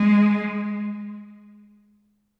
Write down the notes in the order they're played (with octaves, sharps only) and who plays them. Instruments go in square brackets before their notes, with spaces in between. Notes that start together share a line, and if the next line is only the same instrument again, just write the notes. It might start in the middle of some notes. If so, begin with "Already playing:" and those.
Already playing: [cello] G#3